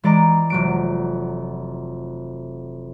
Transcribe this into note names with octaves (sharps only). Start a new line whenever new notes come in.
E3 G#3 D5 D#5 A#5 D7
F1 F#3 D7